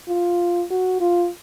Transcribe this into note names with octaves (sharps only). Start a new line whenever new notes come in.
F4
F#4
F4